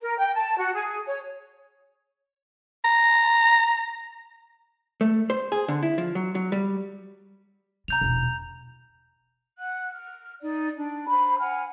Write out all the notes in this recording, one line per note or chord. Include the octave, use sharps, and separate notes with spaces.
A#4
G5
A5
F#4
G#4
C#5
A#5
A3
C5
G#4
D3
E4
F3
F#3
F#3
G3
C3 A#5 G6 F7
E1 A#1
F#5 F#6
F6
D#4 D5
D4
C5 A#5 B5
F#5 G#5 F6